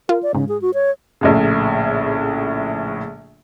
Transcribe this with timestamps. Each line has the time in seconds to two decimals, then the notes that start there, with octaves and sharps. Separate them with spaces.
0.09 F4 A#4
0.23 D5
0.35 G#2 C#3
0.49 G#4
0.62 F#4
0.74 C#5
1.21 A#1 A2 C#3